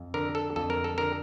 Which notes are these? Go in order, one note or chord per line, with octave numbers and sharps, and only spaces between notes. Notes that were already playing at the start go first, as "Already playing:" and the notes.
Already playing: F2
D3 A#4
A4
F2 A4
A#4
A4
D3 A#4